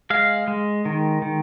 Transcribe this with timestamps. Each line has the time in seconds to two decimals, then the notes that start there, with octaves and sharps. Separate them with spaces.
0.10 G#3 F5
0.48 G#3
0.85 D#3
1.22 D#3